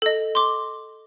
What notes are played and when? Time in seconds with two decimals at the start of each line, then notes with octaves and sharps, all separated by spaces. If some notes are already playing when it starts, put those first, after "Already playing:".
0.02 A4 D#5
0.35 C6 D6